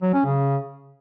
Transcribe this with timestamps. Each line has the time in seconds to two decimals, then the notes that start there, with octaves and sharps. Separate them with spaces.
0.02 F#3
0.14 C#4
0.25 C#3